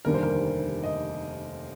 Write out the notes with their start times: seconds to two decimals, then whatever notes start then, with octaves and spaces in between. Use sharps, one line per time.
0.05 F1 D#2 D3 G3 A#4
0.14 C5
0.23 A#4
0.83 D#5